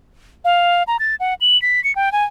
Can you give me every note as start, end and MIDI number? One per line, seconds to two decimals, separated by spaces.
0.44 0.83 77
0.87 0.97 82
0.99 1.15 93
1.20 1.34 78
1.41 1.60 102
1.62 1.83 95
1.84 1.94 97
1.96 2.12 79
2.12 2.24 80